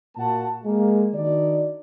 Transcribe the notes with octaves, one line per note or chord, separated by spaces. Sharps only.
A#2 A#3 F#4 F#5 A5
G#3 A#3
D#3 D4 D#4 F#4 D5